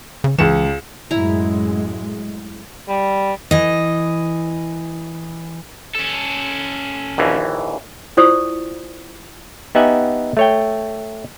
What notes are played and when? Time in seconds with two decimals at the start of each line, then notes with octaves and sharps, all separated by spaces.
0.24 C#3
0.38 C#2 E3 C#7 E7
1.11 F#2 A2 G#3 E4 A#5
2.88 G3
3.51 E3 D#5
5.95 C#4 A4
7.18 A#1 D#2 E3
8.17 E4 F4 C5 D5 C#6 D#6
9.75 B3 D#4 G4 E5 F#5 G#5
10.37 A3 C#5 G5